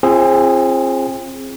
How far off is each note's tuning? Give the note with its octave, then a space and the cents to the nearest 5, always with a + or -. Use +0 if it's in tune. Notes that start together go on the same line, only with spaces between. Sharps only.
C4 +30 F4 -30 G#4 +0